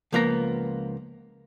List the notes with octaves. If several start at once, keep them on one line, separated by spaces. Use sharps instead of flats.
C#2 F3 A#3 B3 A#4 A#5